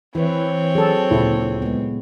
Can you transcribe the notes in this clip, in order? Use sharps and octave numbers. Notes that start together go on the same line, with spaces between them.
E3 C4 E4 B4 C#5
F#3 G#4 A4
D2 A#2 C#3 E4 A4
G#3 B3